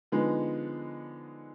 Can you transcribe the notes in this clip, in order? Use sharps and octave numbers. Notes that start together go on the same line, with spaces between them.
D3 F3 G#3 B3 D#4